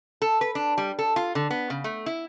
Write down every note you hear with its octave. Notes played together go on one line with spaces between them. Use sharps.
A4
B4
D4
G3
A4
F4
D3
B3
C#3
A3
E4